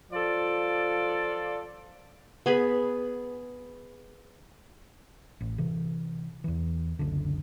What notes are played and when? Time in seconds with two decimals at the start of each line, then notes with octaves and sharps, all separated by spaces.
0.12 F3 F4 A4 D5
2.46 B3 G#4 B5
5.41 A1
5.58 C3 E3
6.44 E2 E3
6.99 F#1 C#2 D3